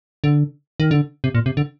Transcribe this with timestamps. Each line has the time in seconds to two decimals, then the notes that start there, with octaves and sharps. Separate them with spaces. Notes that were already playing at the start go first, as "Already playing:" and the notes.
0.24 D3
0.80 D#3
0.91 D3
1.24 C3
1.35 A#2
1.46 C3
1.57 D3